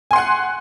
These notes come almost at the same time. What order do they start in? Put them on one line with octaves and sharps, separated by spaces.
G#5 C6 F#5 F#6